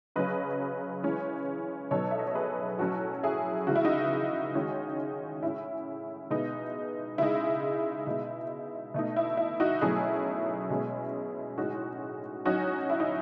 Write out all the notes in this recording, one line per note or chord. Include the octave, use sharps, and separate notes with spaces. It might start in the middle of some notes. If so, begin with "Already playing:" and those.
C#3 F#3 C#4 B4 D#5
E3 G#3 C#4
B2 F#3 B3 D#4 A4 C#5
E5
D#5
C#5
G#4 B4
A2 F#3 C#4 F#4 A4
E4 G#4
C#3 E3 G#3 F#4
E4
D#4 F#4
D#3 G#3 C#4
A2 G#3 C#4 E4
B2 G#3 B3 D#4
C#3 G#3 D#4 E4
B2 G#3 D#4
B2 A3 D#4
E4
E4
D#4 F#4
B2 F#3 A3 C#4 E4 G#4
B2 G#3 C#4
A2 G#3 C#4 D#4 F#4
A2 F#3 C#4 D#4 F#4
E4
D#4